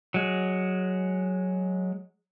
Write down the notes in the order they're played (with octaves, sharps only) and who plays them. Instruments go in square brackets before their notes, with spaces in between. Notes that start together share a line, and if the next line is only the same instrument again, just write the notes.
[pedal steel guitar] F#3 G#3